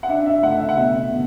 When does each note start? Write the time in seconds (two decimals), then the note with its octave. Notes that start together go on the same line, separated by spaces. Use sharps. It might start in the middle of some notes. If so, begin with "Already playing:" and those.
0.03 F#5
0.09 D4 E5
0.26 E5
0.43 A3 F#5
0.59 E5
0.69 F#5
0.77 B2 E5
1.11 B2